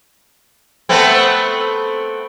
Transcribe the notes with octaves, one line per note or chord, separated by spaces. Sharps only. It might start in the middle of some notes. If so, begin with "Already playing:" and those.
A3 B3 C4